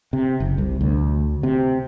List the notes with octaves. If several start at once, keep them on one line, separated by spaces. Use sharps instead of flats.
C3
F#1
C2
D2
C3